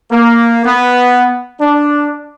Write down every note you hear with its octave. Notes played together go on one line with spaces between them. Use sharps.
A#3
B3
D4